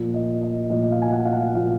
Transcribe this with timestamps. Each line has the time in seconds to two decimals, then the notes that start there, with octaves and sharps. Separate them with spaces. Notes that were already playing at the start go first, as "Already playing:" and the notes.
Already playing: A#2 F3
0.14 D#5
0.42 D#5
0.70 A#2 F3 D#5
0.82 D#5
0.91 F5
1.02 G#5
1.11 F#5
1.25 F5
1.33 F#5
1.54 A#2 F3 F5